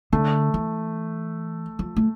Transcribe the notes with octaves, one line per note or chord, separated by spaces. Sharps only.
D3 A3
E3
F3
A3